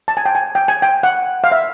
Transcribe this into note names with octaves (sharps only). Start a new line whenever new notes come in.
A5
G#5
G5
G#5
G5
G#5
G5
F#5
F5
E5